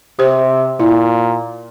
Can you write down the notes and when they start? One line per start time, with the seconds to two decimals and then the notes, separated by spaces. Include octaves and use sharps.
0.19 C3 G4 C5
0.80 A#2 E4